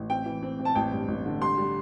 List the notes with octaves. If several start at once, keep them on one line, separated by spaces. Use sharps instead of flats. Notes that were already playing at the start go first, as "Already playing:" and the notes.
Already playing: A1
C4 G5
E3
C4
C4
A5
A1 G5
G2
A1
D3
G3 C6
G3